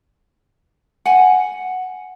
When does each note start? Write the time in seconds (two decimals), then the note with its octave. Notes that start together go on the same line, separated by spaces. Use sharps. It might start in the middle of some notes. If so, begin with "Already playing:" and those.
1.06 F#5 G#5